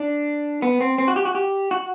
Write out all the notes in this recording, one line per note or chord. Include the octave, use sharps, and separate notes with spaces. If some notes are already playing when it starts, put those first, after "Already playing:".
Already playing: D4
B3
C4
C4
F#4
G4
F#4
G4
F#4